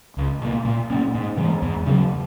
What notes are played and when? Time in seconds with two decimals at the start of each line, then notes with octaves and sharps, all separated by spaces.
0.17 C#2
0.42 B2 A#3
0.65 A#2
0.90 A#3 C#4
1.14 G#2
1.38 E3 G#3
1.62 E2
1.86 C#3 F#3